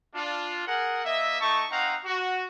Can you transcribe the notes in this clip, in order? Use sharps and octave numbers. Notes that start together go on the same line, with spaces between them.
D4 F4
G#4 A#4 F#5
A#3 D#5 E5
A3 D#4 A5 C#6
C4 D#4 F5 F#5 A#5
F#4